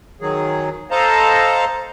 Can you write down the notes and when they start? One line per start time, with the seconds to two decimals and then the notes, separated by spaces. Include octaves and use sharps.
0.21 D#3 F#3 G#4
0.91 A4 C5 D#5 F5 A5 A#5